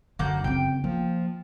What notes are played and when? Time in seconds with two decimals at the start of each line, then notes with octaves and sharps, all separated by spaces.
0.19 F#2 D3 A#3 D4 F#5 G6
0.44 C#3 C4 G5
0.84 F3 A#3